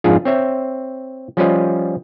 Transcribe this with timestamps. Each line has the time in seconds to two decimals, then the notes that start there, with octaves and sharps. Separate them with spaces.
0.04 F2 G#2 F3 D4 F4 G#4
0.25 C4 C#5 E5
1.37 F3 G3 C#4 F4 B4 D#5